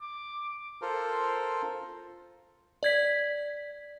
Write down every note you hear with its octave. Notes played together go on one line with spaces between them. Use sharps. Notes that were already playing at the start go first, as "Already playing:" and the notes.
D6
F4 A4 A#4 C5
D5 G#6 B6